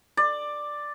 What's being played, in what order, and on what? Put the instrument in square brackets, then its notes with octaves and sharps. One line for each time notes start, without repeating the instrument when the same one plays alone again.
[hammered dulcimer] D5